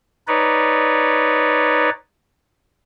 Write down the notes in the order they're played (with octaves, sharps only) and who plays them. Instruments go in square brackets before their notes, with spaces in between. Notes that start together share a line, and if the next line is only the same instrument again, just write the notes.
[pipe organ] D#4 B4 C#5 D5